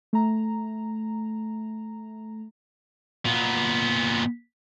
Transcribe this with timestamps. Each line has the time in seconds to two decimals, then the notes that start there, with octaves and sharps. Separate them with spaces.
0.13 A3 A#5
3.25 A#2 B3